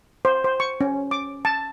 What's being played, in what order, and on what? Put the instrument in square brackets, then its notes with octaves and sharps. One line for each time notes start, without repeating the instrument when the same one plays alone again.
[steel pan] C5
C5
C#6
C#4
D6
A5